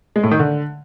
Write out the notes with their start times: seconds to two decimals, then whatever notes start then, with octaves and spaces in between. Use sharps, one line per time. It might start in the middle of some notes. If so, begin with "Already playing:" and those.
0.16 G#3
0.24 A2
0.31 D#3
0.39 D3